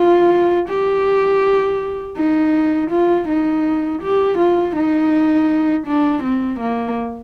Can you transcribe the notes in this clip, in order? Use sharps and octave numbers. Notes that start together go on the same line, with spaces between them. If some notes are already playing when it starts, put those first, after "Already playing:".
Already playing: F4
G4
D#4
F4
D#4
G4
F4
D#4
D4
C4
A#3